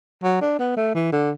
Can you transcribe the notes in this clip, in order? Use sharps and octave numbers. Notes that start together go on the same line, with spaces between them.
F#3
D4
B3
A3
E3
D3